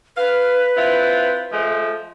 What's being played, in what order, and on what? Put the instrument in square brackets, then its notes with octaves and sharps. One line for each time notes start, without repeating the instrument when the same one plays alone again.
[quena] B4 [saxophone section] F5
[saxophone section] C4 E4 F4
F3 G#3 A3